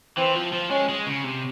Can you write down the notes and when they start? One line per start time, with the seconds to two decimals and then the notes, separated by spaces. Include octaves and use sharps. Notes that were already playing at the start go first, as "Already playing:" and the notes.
0.17 E3 C4
0.36 F3
0.53 F3
0.71 G#3 C#4
0.89 G#3
1.06 C#3
1.24 C3